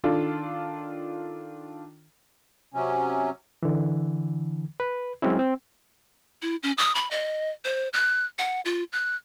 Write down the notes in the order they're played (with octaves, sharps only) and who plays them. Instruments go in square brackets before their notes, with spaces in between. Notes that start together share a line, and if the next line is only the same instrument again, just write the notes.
[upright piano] D#3 D4 F4 A4
[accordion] C3 F#3 C#4
[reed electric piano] D3 E3
B4
F#3 G#3 C4 C#4 E4
C4
[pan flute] E4
C#4
D#6
B5
D#5
C5
F#6
F#5
F4
F#6